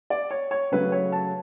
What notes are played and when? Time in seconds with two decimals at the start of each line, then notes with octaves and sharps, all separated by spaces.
0.10 D5
0.31 C#5
0.51 C#5
0.72 C#3 F#3 A3 B4
0.92 C#5
1.12 A5